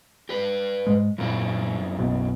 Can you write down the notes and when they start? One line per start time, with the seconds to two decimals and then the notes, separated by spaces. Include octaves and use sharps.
0.29 G4 B4
0.86 G#2 G#3
1.18 F#2 A#2 C4 E4
1.98 B1 B2 B3